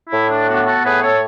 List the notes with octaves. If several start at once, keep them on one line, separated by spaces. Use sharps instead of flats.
A2 E4
D4
B3 D4 F#4
F#4 A4
A2 G#4 B4
A4 C#5